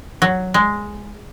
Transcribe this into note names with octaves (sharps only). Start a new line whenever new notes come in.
F#3
G#3